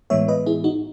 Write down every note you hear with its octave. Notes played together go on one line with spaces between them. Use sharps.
A2 E3 G#3 B3 C#5 E5
B4 D#5
E4 G#4
D#4 F#4